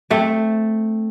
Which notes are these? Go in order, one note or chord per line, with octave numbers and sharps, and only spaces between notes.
A3 C4